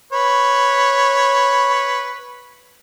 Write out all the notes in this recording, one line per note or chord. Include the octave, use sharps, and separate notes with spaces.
B4 C#5